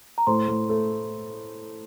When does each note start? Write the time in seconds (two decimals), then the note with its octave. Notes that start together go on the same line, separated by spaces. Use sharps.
0.18 A#5
0.27 A2 C5 C6
0.48 A2
0.70 A3